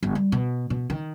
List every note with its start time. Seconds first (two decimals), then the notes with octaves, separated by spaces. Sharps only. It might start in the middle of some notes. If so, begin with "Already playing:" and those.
0.03 G1
0.15 G3
0.32 B2
0.70 B2
0.90 D#3